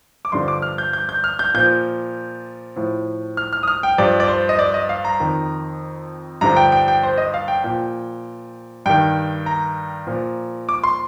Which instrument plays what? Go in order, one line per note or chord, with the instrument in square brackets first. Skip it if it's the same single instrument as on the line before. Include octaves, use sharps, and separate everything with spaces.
[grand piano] D6
G2 D3 F3 C6
D6
F6
G6
G6
G6
F6
G6
A#2 F3 G6
A2 F3
F6
F6
D#6
F6
G5
G2 F3 D5
D5
C5
D#5
D5
D#5
F5
A#5
F2 D#3
G2 D3 F3 A#5
G5
G5
G5
C5
D#5
F5
G5
A#2 F3 G5
G2 D#3 G5
A#5
A#2 F3
D6
C6